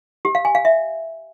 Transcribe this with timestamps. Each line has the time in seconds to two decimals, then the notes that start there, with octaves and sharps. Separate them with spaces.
0.25 G4
0.35 F5
0.45 G#5
0.55 F5
0.65 E5